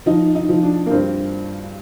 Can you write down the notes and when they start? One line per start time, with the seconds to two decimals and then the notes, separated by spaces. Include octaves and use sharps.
0.06 F3 D#4
0.35 D#4
0.49 F3
0.63 D4
0.86 A#3
0.90 G2 C4